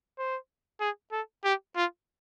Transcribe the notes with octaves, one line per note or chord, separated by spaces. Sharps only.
C5
G#4
A4
G4
F4